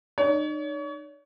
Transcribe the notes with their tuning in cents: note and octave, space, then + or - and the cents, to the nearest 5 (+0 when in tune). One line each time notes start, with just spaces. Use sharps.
D#4 -40 C#5 +35